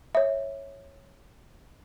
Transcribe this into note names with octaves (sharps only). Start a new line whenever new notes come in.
C#5 E5